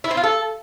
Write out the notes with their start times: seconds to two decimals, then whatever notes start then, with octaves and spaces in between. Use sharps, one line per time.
0.04 E4
0.11 C4
0.17 F4
0.24 A4